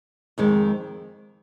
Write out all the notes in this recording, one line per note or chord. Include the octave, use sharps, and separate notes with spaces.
F2 D#3 G#3